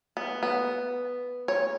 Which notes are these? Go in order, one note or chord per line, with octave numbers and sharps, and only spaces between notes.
B3
B3
C#5